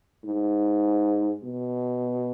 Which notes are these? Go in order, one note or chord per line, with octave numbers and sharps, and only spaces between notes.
G#2
B2